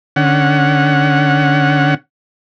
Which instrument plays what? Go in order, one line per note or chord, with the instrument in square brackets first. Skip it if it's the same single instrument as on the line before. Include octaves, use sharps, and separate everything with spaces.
[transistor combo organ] D3 C#4 F#5